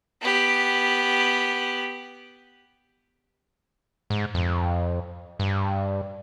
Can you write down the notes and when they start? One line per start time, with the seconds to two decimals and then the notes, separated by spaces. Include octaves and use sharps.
0.21 B3 G4
4.10 G#2
4.34 F2
5.39 G2